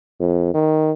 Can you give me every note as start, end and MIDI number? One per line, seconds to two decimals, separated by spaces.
0.20 0.52 41
0.54 0.92 51